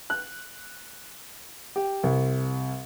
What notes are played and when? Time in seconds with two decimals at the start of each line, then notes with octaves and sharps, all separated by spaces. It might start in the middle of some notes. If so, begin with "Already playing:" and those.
0.10 F#6
1.76 G4
2.03 C2